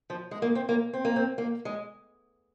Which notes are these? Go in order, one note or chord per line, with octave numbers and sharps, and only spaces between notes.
F3
G#3
A#3
C4
A#3
C4
A#3
C4
A#3
G#3